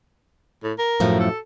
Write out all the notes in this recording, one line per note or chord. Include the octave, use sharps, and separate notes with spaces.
A2
A#4
F#2 A2 F3
A4